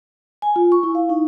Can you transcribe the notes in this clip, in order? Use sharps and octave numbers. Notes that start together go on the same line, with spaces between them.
G#5
F4
C#6
E4
F5
D#4